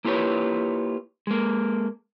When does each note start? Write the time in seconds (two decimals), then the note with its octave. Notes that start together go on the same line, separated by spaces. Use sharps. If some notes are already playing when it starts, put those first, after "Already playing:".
0.05 A#3 E4 F4 G4 B4 C#5
1.27 G#3 A#3